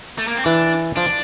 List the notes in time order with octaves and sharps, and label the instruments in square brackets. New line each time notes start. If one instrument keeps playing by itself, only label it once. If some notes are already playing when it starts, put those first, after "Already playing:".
[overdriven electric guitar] A3
A#3
C4
[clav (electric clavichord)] E3 [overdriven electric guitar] D4
[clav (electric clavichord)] F3 [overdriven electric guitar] D4